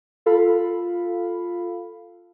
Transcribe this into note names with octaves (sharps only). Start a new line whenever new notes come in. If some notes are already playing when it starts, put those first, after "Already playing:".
F4 A4 F5 B5